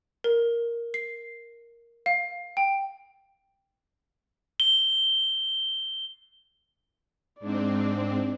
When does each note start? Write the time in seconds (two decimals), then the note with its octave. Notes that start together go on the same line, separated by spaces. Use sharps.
0.24 A#4
0.94 C7
2.06 F5
2.57 G5
4.60 G7
7.40 G#2 C4 D4 D5